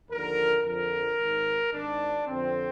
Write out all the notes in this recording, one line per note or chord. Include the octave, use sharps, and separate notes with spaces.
D#2 D3 F3 A#4
F2 D3 F3 A#4
G#1 G#2 D#3
G#1 G#2 D#3 D4
F2 D3 F3 C4